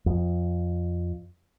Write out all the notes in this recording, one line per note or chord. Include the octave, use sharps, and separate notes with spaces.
F2